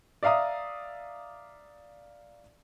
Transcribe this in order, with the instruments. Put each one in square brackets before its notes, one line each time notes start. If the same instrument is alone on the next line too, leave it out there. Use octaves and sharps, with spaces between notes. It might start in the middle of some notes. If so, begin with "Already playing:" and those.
[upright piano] D5 E5 F5 A#5 D#6